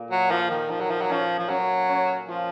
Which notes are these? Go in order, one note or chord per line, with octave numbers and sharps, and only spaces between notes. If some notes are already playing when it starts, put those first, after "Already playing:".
Already playing: A#2 A#3
F#3
F3 A#3
D#3
D#3 F3
F#3
F3
F#3
F3 C#4
F3
F#3 C#4
C#4
F3 F4